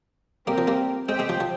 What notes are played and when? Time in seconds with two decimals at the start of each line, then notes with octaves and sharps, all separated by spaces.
0.47 G3 A#3 C4 G4 A#4
0.58 F3
0.68 G3 A#3
1.09 G#3 C4 G4 C5 G5
1.19 G#3 C4
1.29 F3
1.40 F3